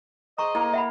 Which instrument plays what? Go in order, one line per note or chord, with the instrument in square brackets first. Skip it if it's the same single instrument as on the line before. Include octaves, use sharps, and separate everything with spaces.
[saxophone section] G#4 C5 D#5 [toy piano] A#5 C#6
[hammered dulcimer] A#3 [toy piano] E4
[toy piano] E5 F#5 B5